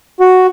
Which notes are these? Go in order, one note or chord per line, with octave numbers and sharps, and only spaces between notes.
F#4